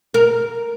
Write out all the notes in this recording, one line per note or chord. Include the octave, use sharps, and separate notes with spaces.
A#4